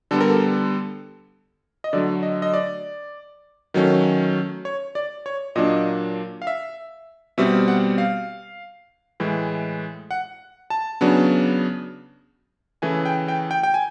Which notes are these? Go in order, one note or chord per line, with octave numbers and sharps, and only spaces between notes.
D3 G3 B3 A4
A#4
A4
D#5
D3 F#3 A3 D5
D#5
D#5
D5
D#3 F#3 A3 C#4
C#5
D5
C#5
A#2 F#3 A#3 D4 D#5
F5
E5
B2 G3 C4 E5
F#5
F5
A2 E3 G#3
F#5
A5
C#3 F#3 B3 D4
C#3 E3 A3 G#5
G5
G5
G5
G5
G#5